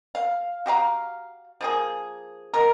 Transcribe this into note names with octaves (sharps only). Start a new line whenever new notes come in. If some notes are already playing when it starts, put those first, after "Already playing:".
F5
F#4 G4 F5 A#5
F3 A#3 G#4
B2 A#4